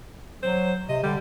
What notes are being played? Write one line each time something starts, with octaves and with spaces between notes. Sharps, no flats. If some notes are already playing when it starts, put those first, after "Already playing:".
F#3 C5
C3 D#5
D3 G3